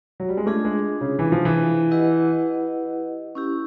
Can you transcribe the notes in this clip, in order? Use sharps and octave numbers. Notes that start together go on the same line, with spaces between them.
F#3
G3
G#3
A3 D4 F4 G#4
G#3
C#3
E3
F3
E3
E4 G4 B4 D#5 F#5
C#4 E4 G4